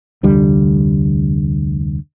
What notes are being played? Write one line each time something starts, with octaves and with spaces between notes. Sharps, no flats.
F1 D2 D3 G3